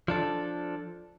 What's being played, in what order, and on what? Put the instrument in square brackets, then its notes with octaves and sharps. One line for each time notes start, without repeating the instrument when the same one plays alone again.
[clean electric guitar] F3 D4 A4